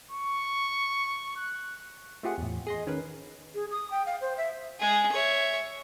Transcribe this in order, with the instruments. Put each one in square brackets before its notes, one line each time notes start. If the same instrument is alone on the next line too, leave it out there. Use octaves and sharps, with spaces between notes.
[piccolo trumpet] C#6
F#6
[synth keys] A3 C4 F4 G4 G#4 F#5
E2 A2
G#4 D#5 C6
D#3 C#4 A#4 B4
[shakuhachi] G#4
D#6
G5
F5
C5
E5
[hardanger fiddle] G#3 G#4
C#5 E5